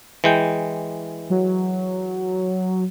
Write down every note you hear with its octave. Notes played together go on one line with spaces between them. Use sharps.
E3 G#3 G5
F#3